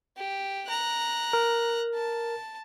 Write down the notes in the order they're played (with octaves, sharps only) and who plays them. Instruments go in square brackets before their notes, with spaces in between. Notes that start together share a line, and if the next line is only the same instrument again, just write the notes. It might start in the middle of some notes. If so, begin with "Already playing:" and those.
[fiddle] G4
A#5 F#6
[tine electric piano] A#4
[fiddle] A5